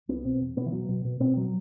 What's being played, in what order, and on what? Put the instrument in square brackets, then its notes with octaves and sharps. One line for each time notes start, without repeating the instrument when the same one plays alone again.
[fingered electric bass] C2 B3
B2 C4
E2
B2 B3
E3
B2 F#3
B2
B2
B2 C4
F#3